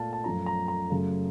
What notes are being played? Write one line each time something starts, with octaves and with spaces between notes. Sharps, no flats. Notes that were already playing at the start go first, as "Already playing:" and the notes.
Already playing: A#2 A3 F5 A5
A5
F#2 F3 A3 A#5
A#5
A#5
F#2 C#3 F#3 A3